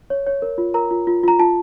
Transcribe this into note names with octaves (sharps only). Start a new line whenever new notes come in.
C#5
C#5
A#4
F4
A#4 A#5
F4
F4
F4 A#5
F4 A5